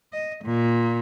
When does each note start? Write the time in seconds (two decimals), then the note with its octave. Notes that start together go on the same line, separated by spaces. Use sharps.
0.13 D#5
0.44 A#2